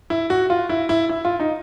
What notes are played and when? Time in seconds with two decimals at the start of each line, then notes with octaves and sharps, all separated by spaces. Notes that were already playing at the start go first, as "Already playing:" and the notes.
0.10 E4
0.30 F#4
0.50 F4
0.69 E4
0.89 E4
1.09 E4
1.25 F4
1.40 D#4